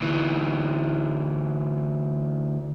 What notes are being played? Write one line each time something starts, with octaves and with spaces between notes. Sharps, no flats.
D2 E3